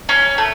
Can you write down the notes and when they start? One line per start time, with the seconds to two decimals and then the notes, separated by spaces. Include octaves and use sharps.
0.09 C#4
0.38 A3